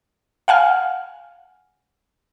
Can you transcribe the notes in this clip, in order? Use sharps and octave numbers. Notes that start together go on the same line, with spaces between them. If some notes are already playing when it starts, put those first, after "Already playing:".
F5 F#5 G#5 F6